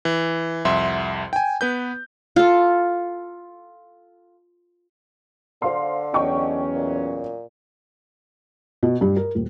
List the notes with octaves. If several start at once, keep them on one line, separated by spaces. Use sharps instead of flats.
E3
C2 F2 E5 F#5 C6
G5 G#5
B3 B4 G6
F4 A4
D3 C5 F5 C6
E2 F#3 C#4 D#5 G5 C#6
A#2
B2
G2
A#4
D#1